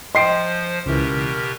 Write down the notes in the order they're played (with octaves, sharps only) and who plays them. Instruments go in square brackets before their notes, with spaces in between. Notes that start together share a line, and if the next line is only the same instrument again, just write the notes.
[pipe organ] F3 C5 [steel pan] D#5 G5 [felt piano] C6 C7 D7
[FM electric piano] C#2 E3 [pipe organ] B2 G4 A#4